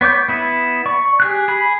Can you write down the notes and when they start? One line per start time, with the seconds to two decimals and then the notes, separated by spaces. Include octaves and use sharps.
0.01 B3 C#5 D6 G6
0.28 B3 E4 D#6
0.86 D5 C#6
1.20 G4 G#4 F#6
1.48 G#4 B5